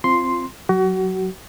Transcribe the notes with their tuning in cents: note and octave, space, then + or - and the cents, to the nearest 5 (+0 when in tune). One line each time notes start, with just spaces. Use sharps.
C4 +0 F4 -15 C6 +0
F#3 +0 F#4 +30